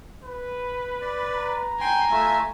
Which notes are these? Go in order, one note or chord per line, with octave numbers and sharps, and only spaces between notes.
B4
D5
A#5
G5 G#5 C6
A3 F4 E5